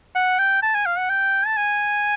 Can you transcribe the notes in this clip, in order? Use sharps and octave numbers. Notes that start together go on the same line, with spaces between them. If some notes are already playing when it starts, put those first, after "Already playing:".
F#5
G5
A5
G#5
F5
F#5
G5
A5
G#5